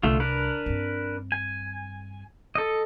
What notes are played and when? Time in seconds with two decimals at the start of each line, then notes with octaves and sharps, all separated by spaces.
0.03 C2 D3 A3 F4
0.20 D4 A#4 B4
0.66 G2 C4
1.32 G#5
2.55 A4 D#5